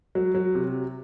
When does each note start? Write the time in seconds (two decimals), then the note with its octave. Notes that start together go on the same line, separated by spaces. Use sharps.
0.15 F#3
0.35 F#3
0.55 C3